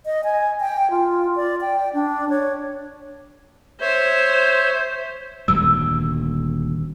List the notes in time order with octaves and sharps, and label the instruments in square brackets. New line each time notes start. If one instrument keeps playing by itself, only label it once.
[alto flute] D#5
G#5
G5
F4
D5
G5
D4
C#5
[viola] C5 [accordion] C#5 E5
[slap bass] D#1 D2 G3 [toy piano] E6